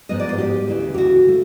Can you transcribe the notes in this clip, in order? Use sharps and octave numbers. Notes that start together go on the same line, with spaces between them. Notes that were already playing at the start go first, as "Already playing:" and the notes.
G#2 F3 G#3 B3 D#5
D5
C5
G#4
G4
D2 C#3 E3
G4
F#4
A3